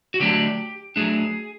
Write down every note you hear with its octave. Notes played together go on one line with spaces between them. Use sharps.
F#4
D3 F#3 A3 D4 G4
F#3 A3 D4 G#4